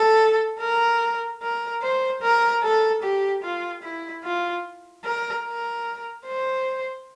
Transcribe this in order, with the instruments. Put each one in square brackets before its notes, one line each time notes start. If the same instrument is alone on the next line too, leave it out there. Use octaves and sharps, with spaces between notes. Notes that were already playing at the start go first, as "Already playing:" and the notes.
Already playing: [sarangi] A4
A#4
A#4
C5
A#4
A4
G4
F4
E4
F4
A#4
A#4
C5